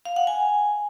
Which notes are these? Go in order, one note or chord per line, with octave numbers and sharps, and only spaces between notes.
F5
F#5
G#5